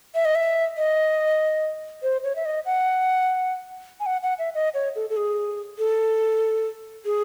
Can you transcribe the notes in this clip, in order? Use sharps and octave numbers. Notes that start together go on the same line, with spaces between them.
E5
D#5
E5
D#5
C5
C#5
E5
D#5
F#5
G#5
F#5
F#5
E5
D#5
C#5
A4
A4
G#4
A4
G#4